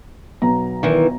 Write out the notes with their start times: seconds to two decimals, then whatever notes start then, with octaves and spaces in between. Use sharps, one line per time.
0.42 B1 B3 A#5
0.83 D#3 E3